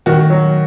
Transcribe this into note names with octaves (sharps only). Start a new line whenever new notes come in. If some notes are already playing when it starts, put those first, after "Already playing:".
D#3 F#4
F#3